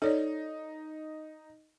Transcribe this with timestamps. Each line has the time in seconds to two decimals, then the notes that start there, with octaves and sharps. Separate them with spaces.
0.02 D#4 A4 C#5 D5